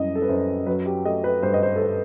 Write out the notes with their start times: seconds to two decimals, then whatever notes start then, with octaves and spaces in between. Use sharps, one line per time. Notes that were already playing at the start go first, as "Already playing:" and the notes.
Already playing: F#2 E3 G3 D#5
0.15 A4
0.22 B4
0.29 F#2 C5
0.66 F#3 B4
0.86 G4
1.05 A3 D#5
1.24 B4
1.43 G2 C5
1.54 D#5
1.63 C5
1.76 A4
1.82 B4